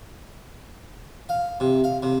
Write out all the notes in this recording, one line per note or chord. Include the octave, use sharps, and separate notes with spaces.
F5
C3
F5
C3